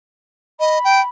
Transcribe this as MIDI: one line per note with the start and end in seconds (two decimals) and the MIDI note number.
0.60 0.79 75
0.60 1.09 83
0.84 1.01 79